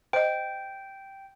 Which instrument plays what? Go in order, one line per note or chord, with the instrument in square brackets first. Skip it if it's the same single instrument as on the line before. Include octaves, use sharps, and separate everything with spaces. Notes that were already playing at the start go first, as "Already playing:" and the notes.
[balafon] C5 D#5 [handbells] G5